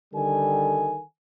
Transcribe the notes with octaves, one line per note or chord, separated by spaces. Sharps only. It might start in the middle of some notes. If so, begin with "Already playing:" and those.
D3 D#3 G3 A4 G#5